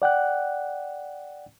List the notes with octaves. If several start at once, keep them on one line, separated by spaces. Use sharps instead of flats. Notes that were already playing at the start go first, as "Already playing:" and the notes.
D5 F#5 G5 F#6